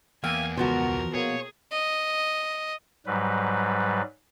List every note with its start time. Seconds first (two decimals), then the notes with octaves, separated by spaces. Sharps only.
0.24 E2 A#3 F5 G5 G#5 E6
0.57 C#2 B2 F3 B3 F#4 A#4
1.15 B2 A#3 F4 G#4 C#5
1.72 D#5
3.06 G#2 F#3 G3 B4